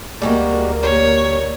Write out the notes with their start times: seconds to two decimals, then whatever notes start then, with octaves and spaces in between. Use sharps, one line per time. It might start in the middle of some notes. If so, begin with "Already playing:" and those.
0.22 D2 G3 G#3 A#3 F#4
0.83 G3 C#5